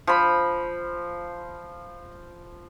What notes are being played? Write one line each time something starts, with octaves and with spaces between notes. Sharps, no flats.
F3 B5